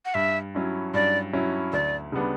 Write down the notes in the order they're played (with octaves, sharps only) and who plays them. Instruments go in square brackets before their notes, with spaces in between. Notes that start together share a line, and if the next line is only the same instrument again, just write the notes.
[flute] F#5
[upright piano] G2 [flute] E5
[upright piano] F#3 C#4 E4
[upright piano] G2 [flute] D5
[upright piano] F#3 C#4 E4
[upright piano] D2 [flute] D5
[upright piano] C#3 G3 B3 D4